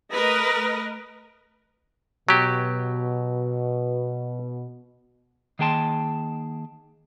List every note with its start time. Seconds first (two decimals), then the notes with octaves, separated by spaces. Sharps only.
0.14 A3 A#4 B4 D#5
2.29 B2 F#3 G4
5.59 D#3 A#3 G#4 G5 A5 C6